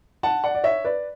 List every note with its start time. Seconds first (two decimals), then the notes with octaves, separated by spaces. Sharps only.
0.23 F#5 A5
0.44 D5 F#5
0.55 D5
0.64 C#5 E5
0.85 B4 D5